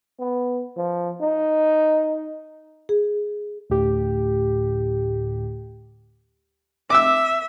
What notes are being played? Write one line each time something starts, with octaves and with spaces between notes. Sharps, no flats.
B3
F3
D#4
G#4
D2 A2 G4
E5 D6 E6